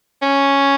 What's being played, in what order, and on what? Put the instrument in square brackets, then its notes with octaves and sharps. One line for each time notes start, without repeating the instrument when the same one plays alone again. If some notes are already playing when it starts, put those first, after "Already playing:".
[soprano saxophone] C#4